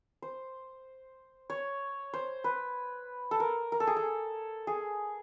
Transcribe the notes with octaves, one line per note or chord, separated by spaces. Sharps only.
C5
C#5
C5
B4
A4
A#4
A#4
A4
G#4
A4
G#4